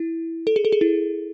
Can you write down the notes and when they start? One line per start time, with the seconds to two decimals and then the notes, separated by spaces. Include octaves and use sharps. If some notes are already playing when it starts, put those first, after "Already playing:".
Already playing: E4
0.47 A4
0.56 G#4
0.65 A4
0.72 G#4
0.81 E4